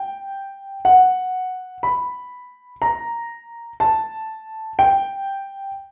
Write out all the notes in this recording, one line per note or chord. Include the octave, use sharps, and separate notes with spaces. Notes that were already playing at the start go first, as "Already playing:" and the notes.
Already playing: G5
F#5
B5
A#5
A5
G5